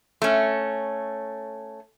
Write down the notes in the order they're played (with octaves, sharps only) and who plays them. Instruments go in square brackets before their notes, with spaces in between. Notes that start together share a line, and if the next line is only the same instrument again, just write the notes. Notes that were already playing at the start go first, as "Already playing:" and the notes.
[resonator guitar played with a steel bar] A3 C#4